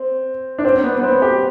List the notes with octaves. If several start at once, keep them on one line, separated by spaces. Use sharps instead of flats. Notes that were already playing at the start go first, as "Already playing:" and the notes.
Already playing: C4
D4
C4
C4
B3
B3
C4
G4